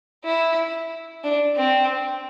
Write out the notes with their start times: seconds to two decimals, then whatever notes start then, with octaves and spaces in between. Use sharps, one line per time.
0.25 E4
1.24 D4
1.56 C4